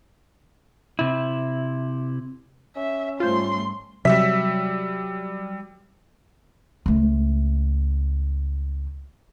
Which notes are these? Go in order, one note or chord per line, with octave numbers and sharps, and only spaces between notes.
C3 E4
C#4 E5
G#2 G3 A3 F4 C5 C6
C3 F#3 G3 E5 E6 B6
C#2 A3